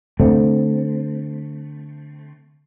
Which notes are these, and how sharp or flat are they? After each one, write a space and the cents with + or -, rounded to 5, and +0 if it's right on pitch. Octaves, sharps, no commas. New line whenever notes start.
D3 +0 A3 +0 C4 +0